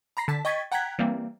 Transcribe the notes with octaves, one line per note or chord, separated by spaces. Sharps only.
A#5 B5 A#6 C7
D3 A5 B6
D#5 G5 C#6 G#6 A6 B6
F#5 G5 A#5 F#6 G#6 B6
E3 G3 A#3 C4